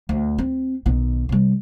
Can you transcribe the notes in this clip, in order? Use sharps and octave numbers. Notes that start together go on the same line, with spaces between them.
D2
C4
B1 D#3
C3 G3